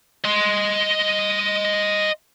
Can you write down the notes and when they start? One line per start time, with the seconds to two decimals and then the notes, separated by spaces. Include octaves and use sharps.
0.25 D#5 C6